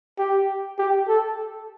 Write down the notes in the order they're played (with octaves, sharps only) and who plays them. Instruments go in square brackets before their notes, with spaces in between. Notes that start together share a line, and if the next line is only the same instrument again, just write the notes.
[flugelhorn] G4
G4
A4